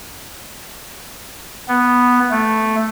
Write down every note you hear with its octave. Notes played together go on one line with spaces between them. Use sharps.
B3
A3